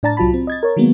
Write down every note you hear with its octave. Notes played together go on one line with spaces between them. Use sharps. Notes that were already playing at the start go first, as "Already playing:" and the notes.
A2 D4 D5 A5 A#5 A6
C2 F#3 F4 A5 B5
C4
D#5 G#6 A6
A#4 C#5
D#3 F#3 G#3 A#3 B3